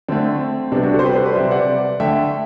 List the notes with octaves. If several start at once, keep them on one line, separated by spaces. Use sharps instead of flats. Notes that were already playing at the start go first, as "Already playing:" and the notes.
D3 A3 C4
C3 G3 B3 D4
D4 F#4
F#4 A4
C5
G4 B4
A4 C5
B4 D5
C3 G3 C5 E5
D5 F#5
D3 A3 E5 G5